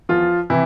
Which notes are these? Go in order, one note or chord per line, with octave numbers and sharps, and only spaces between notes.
E2 F3 F4
C3 E3 E4